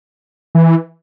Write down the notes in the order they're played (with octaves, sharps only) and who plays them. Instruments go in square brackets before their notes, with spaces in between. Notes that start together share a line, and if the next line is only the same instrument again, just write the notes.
[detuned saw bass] E3